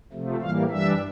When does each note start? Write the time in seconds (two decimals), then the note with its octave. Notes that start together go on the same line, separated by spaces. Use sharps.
0.13 C3 F3 A3
0.42 A2 E3 G3 A#3 F5
0.70 G2 E3 G3 D4 E5